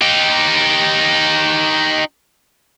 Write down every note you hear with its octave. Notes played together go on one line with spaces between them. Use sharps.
D#4 G4